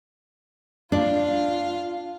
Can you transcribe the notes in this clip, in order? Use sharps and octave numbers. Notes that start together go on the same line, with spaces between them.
D4 F4 F5